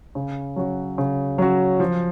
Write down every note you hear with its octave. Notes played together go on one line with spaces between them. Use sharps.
C#3
F#3 C#4 F#4
C#3
F#3 C#4 F#4
F3